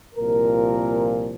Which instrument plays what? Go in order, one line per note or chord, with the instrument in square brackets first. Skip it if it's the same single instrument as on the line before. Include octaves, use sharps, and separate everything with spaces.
[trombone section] C2 A#2 F3 A#4